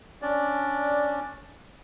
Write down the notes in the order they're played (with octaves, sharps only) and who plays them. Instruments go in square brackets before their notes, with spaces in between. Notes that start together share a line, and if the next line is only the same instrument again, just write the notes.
[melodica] C#4 D4 D5